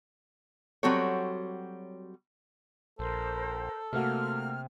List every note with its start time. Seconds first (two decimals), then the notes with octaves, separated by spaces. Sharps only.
0.83 F#3 G3 C4 F#4 A4 C#5
2.99 A#1 A4 A#4 C5
3.93 C3 A3 A#3 F#4 F6